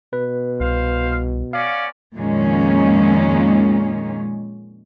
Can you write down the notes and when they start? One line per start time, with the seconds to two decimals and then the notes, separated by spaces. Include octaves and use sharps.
0.13 B2 B4
0.60 C2 C5 F5
1.53 B3 C#4 D5 F5
2.15 F2 A#2 D#3 G#3 A#3 C#4